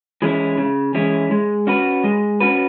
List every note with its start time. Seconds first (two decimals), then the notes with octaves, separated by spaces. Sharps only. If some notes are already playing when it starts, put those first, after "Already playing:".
0.22 E3 G#3 C#4 E4
0.58 C#3
0.95 E3 G#3 C#4 E4
1.31 G#3
1.67 C#4 F#4 B4
2.04 G#3
2.40 C#4 F#4 B4